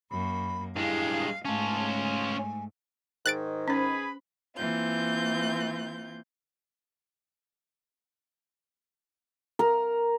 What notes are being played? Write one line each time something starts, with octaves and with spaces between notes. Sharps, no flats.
F#2 A#3 B5
G2 G#3 E4 F5
G#2 A3 C#4 F4 A5
G#5
G#2 D#3 F#6 A6 D7
C#4 G#4 B4 C5 B5
E3 A#3 C4 F4 G6
A#4